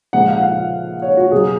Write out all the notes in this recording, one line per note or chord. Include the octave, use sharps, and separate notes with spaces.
A#2 F3 G#3 F#5
F5
F#5
F5
C#5
F#4
B2 F#3 G#4